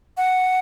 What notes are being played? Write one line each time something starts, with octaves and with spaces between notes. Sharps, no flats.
F#5